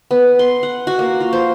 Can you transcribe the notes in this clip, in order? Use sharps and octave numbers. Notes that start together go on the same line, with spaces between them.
B3
C6
F#5
F#4
A#3
F4
C5